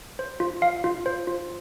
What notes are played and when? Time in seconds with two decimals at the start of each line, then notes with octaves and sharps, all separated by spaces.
0.19 C5
0.40 F4
0.62 F5
0.84 F4
1.06 C5
1.27 F4